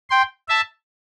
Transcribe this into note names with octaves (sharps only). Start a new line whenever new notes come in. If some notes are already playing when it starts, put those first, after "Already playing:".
G5 C6
E5 A5